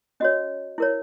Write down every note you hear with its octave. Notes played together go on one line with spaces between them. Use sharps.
C#4 F#4 C#5 D#5
E4 A#4 C#5